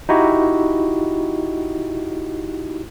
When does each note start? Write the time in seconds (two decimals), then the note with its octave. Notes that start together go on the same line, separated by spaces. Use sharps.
0.09 D#4 E4 F#4 G4